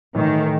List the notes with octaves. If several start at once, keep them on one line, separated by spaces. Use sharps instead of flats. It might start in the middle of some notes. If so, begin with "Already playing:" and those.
A2 D#3 E3 A3 D#4